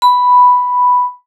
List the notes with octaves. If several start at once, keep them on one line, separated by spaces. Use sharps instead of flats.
B5